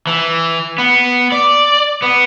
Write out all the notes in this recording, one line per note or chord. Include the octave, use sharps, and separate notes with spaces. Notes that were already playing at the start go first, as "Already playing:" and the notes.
E3
B3
D5
B3